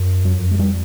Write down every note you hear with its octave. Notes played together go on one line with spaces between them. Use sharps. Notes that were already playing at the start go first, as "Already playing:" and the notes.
Already playing: F#2
F2 F#3
G#3
F2 G3